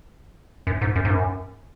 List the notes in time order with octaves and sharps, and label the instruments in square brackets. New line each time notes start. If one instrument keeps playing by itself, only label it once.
[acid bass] F#2
G#2
F#2
G#2
F#2